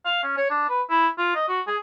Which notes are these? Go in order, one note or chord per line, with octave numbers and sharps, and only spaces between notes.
F5
C#4
C#5
D4
B4
E4
F4
D#5
F#4
G#4